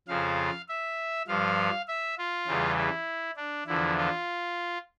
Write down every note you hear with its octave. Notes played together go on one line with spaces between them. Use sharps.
F2 C#3 F3 F5
E5
G2 F3 F5
E5
F4
E2 C#3 E3 G3
E4
D4
E2 D3 F3 E4
F4